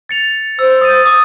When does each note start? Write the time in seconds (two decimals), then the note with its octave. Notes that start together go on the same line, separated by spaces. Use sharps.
0.09 A6 C#7 F7
0.59 C5 E6
0.81 D#6 A6 D#7
1.06 D6 D#6